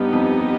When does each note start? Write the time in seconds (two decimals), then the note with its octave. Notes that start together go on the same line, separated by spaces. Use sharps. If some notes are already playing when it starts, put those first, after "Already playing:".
Already playing: G2 B3 D#4 G4
0.13 F2